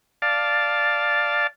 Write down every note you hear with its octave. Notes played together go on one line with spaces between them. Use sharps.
D5 F5 A5